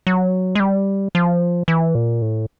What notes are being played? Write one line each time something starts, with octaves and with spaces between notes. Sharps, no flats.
F#3
G#3
G3
F3
E3
A#2
A2